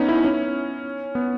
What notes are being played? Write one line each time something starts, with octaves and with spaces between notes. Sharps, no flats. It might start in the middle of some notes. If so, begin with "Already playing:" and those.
Already playing: B3 C#4 D#4
E4
C#4
B3